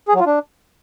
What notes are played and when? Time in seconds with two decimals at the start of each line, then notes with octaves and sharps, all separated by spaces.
0.08 G#4
0.14 F#3
0.20 F4
0.26 D4